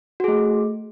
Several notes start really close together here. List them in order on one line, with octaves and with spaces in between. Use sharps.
F#4 G#4 A3